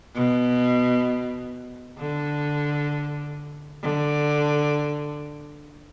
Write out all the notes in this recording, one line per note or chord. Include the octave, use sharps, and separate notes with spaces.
B2
D3
D3